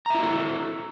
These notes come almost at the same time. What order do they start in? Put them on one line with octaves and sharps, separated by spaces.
A#5 E5 E4 F#4 A4